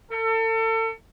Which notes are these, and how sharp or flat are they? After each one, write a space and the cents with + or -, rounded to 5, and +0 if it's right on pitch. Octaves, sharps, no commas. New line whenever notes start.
A4 +35